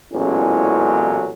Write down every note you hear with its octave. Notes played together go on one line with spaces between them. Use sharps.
A1 E2 A#2 F#3 G#3 C#4